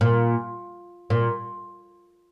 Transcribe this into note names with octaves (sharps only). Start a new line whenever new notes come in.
A#2
A#2